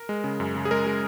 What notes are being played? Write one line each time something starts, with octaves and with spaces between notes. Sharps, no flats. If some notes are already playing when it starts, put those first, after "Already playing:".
Already playing: A#4
G#3
C#3
F#2
C#3
G#4
G#3 A#4
G#3